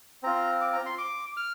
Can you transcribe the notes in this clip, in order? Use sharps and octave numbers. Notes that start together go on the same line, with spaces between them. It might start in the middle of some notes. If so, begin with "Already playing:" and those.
C4 F4 A#5
D6
A#5
C6
D6
F6